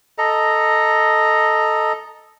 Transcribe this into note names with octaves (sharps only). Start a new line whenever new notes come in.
A4 D#5 A#5